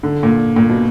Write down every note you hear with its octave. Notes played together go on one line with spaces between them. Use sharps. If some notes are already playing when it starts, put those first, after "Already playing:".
D3
A#2
A#2
B2